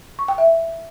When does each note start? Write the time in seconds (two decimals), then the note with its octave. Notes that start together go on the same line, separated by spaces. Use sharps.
0.19 C#6
0.28 G5
0.38 E5